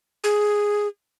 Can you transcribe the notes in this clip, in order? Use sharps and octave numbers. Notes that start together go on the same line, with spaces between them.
G#4